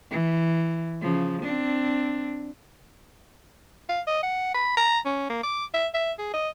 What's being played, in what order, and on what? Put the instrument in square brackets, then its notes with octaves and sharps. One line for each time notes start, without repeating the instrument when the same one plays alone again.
[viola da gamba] E3
C#3 F3
C4 D4
[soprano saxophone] F5
D#5
F#5
B5
A#5
C#4
A#3
D6
E5
E5
G#4
D#5